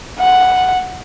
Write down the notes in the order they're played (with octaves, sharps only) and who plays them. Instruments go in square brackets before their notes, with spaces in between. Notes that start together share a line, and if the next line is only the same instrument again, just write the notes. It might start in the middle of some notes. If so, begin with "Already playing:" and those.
[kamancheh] F#5